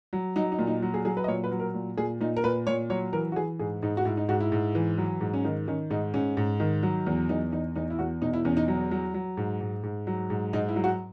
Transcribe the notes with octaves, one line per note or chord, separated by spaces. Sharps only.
F#3
F#3 D#4
D#4
A#2
D#4
F#3
G#4
F#3 G#4
B4
D#5
A#2 C#5
B4
F#3
A#4
A#2
A#2 G#4
A#2 D#4
A#4
A#2 B4
A#2 C#5
F#3 C#5
E3 A#4
F#4
E3 G#4
G#2 G#4
G#2 D#4
F#4
G#2 E4
D#4
G#2 F#4
E4
G#2
E3
F#3
G#2
C#4
D#3 D#4
D#3 C#4
G#2 D#4
G#2 C#4
G#2
D#3
F#3
E2
E2 D#4
E2 D#4
E2 D#4
E4
E2 F#4
B2 D#4
E4
E2 C#4
D#4
F#3
F#3
F#3
G#2
G#2
G#2
F#3
G#2
G#2 D#4
E4
F#3
F#4